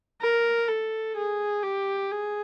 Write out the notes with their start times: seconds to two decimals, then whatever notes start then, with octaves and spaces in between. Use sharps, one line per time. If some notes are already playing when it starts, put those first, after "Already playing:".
0.22 A#4
0.69 A4
1.17 G#4
1.63 G4
2.11 G#4